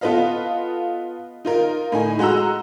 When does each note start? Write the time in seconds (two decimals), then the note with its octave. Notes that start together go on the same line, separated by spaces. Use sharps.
0.01 B3 F4 A4 B4 D#5 F5
1.45 D#4 F4 A#4
1.92 A2 D#4 G#5
2.19 G#3 F#4 F#5 A#5 E6